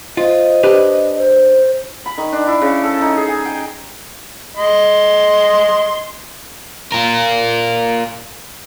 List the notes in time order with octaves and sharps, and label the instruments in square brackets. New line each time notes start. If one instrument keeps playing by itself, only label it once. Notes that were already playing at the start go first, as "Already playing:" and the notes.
[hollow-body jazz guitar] F4 [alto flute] C5 [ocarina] D#5
[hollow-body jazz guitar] D4 G4 B4
[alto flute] C5
[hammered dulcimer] B5
D#3
D4
E4
C#3
A4
D#4
G#4
G#5
G5
[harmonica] D#5 C6
[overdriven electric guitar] F4 A#4